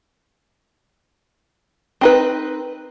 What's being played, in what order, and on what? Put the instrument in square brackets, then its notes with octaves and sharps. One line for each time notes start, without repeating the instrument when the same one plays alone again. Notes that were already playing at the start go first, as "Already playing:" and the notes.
[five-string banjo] C4 D#4 B4